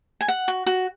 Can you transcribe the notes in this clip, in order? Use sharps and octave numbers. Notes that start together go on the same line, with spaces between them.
G#5
F#5
F#4
F#4